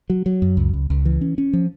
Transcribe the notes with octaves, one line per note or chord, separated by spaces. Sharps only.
F#3
F#3
F#2
C#2
C#2
C#2
E3
C#4
C#4
F3